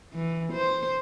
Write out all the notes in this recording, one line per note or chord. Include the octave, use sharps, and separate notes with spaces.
E3
C5